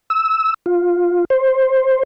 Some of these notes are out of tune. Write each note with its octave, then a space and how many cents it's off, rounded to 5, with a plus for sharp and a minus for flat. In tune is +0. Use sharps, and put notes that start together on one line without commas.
E6 -15
F4 +10
C5 +10